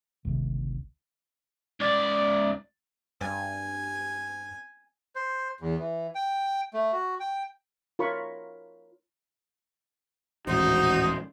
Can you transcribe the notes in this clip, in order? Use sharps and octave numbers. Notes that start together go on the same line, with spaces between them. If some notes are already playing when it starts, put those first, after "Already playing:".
G1 C#2 C3 D#3
C#2 D5
G2 G#5
C5
E2
E3
G5
A3
F#4
G5
F4 A#4 C#5 B5 C#6
D#1 A1 G#2 D#4 F#4 C5